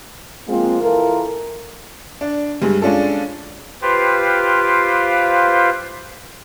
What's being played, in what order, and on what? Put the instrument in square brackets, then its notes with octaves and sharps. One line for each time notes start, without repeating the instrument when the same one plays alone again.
[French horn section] F3 G#3 A#3 C4 F4
E3 F4 A4 A#4
[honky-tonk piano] D4
G2 G3 G#3
G#3 C#4 D4 F4 A4
[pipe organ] F4 G4 B4 C5 F5 G5